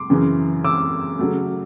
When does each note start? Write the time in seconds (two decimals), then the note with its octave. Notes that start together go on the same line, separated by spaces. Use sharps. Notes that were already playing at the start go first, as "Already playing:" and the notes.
Already playing: C6 D6
0.10 F#2 C#3 E3
0.64 D6 E6
1.19 C#3 F#3 A3